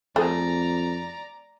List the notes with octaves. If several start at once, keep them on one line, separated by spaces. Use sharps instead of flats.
F2 A3 C4 G#4 D5 A#5